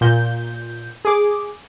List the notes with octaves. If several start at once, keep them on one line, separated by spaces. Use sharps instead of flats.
A#2 G6
G#4 D6